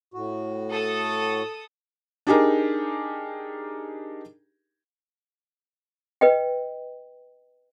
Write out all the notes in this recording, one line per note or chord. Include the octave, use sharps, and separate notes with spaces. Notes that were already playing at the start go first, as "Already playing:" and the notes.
A2 F#4
A4 D#6
D4 D#4 G4 G#4 A#4
B4 D#5 G5